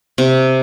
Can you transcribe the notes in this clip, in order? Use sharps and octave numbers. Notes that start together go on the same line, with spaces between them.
C3